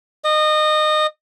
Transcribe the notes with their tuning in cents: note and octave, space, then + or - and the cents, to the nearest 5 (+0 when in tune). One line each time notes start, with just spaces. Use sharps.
D#5 -25